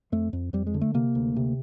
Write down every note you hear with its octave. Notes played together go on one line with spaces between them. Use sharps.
F2 A3
F2
F2 G3
G#3
D3
A3
C3 A#3
D2
C3